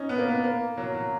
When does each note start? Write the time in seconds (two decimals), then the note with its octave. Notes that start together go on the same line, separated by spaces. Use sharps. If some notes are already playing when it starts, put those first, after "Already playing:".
Already playing: C#4 D#4
0.09 B3
0.18 A#3
0.28 B3
0.44 A#3
0.77 F#3
0.94 F#3